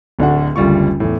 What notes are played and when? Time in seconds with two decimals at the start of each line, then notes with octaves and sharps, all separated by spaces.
0.19 D1 D2 D4 F#4 F#5
0.56 F#1 D2 G3 F4 C#6
1.00 E2 A2